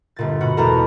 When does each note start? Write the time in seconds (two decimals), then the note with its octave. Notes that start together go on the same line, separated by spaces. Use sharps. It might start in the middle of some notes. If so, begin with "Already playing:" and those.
0.16 G1 A#2 A6
0.40 B2 F#4
0.57 E2 B2 G#3 A4 A#4 A#5